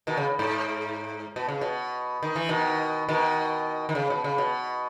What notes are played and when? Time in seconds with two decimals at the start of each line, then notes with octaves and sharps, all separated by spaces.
0.07 B2 D#3
0.17 C#3
0.39 G#2
1.36 B2
1.49 C#3
1.61 B2
2.23 D#3
2.36 E3
2.49 B2 D#3
3.09 B2 D#3
3.89 D#3
3.95 C#3
4.10 B2
4.24 C#3
4.38 B2